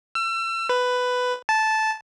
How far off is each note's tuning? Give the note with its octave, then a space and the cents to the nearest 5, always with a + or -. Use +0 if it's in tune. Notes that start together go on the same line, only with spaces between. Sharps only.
E6 +35
B4 +10
A5 -10